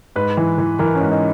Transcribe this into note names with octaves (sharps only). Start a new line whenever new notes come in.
G#2 B4
E3
E3
E3 A#4
C#4
G#2
D#4